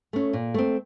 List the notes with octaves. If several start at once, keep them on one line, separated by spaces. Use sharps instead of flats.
A3 C#4
A#2
A3 C4